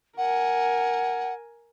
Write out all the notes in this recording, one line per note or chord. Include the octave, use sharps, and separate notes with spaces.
A#4 F#5 G#5